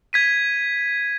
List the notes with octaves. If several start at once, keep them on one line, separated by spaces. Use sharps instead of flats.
G#6 B6 D#7